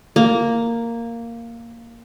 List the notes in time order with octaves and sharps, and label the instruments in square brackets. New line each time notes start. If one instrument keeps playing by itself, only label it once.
[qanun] A#3